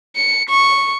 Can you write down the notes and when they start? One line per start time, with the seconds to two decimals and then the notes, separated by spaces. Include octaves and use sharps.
0.16 C#7
0.49 C#6